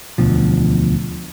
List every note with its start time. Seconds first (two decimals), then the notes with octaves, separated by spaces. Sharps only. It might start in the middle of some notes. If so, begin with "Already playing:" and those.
0.18 E1 D2 B2 F3